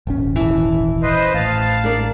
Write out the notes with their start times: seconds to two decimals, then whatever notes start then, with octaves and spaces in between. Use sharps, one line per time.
0.07 D#1 G#1 C#4
0.36 E3 A5
1.03 B4 C5 D#5
1.34 A1 F5 A5
1.84 D4 A#4 D5